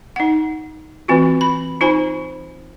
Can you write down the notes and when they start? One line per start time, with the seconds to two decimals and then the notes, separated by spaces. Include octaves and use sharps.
0.16 D#4 F#5
1.08 E3 A3 C4 F4 F#4
1.41 B5
1.81 D#4 F4 C5 G#5 B5